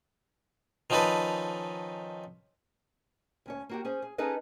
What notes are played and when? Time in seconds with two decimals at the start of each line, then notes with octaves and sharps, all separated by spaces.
0.90 D#3 F3 C#4 D#4 A4 B4
3.46 D2 C#4 C#5
3.69 A#3 F#4 G4
3.85 C#4 G#4 C5
4.02 G#4
4.18 C#4 D#4 G#4 A4 B4 D#5